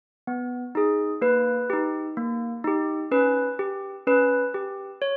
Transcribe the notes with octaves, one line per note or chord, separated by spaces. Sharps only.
B3
D#4 G#4
A#3 B4
D#4 G4
A#3
D#4 G4
C#4 B4
G4
C#4 B4
G4
C#5